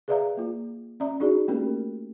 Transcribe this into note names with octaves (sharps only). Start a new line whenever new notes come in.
G#4 B4 D5 E5 F5 A#5
A#3 F4
C#4 D5 E5 A#5
D4 D#4 F#4 G#4 D5
A3 A#3 C#4 G4 A#4